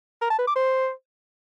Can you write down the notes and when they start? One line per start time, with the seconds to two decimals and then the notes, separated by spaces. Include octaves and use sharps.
0.22 A#4
0.30 A5
0.39 B4
0.47 D6
0.56 C5